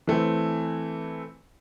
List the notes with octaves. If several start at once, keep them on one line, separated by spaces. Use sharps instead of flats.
E3 A3 C4